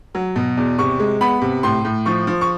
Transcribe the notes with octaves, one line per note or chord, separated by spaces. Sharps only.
F#3
B2
E2
C3 C#6
G#3
B3 B5
C3
A2 C6
A2
F3 C#6
F3
C#6